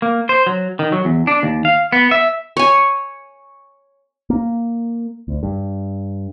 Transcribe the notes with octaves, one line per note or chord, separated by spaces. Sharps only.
A#3
C5
F#3
D#3
F#3
E2
D4
D#2
F5
B3
E5
C#5 G#5
A#3
D2
G2